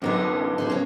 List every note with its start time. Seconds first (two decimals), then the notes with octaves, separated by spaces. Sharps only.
0.02 C2 F#2 D3 B3 D#4 D#5
0.58 D#4 G#4 C5
0.69 A#3 C#4